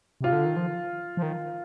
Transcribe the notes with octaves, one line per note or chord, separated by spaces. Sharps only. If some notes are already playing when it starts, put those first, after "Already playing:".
C3 F4
D3
D#3
F3
F3
D#3